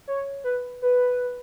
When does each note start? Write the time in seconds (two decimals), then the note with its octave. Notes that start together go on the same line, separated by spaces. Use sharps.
0.08 C#5
0.44 B4
0.82 B4